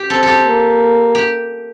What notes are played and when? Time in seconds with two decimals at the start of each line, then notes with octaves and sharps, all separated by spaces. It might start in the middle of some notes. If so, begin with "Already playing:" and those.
Already playing: G4
0.10 C4 A4
0.23 G4 A4
0.46 A#3
1.15 G4